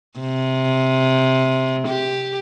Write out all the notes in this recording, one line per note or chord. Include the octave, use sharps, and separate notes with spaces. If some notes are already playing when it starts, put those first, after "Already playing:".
C3
G4